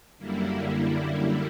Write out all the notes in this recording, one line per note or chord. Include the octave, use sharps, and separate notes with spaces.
F#2 D3 G3 A#3 E4